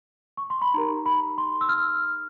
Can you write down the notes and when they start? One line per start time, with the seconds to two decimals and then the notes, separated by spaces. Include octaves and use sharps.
0.37 C#6
0.50 C6
0.62 B5
0.74 D#4 G4 A#4 A#5
1.06 B5
1.38 C6
1.61 E6
1.69 F6